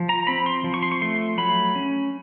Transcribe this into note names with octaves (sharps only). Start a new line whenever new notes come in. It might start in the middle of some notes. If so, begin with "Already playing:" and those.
Already playing: F3
A#5
C4 B5
C6
F3
C#6
C6
C#6
A3 C6
F#3 B5
C#4